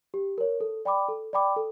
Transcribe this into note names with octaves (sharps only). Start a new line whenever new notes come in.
G4
A#4 C#5
A4
D5 G5 B5 D6
A4
D5 G5 B5 D6
A4